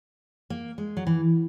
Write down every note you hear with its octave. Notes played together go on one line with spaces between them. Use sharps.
A#3
G#3
F#3
E3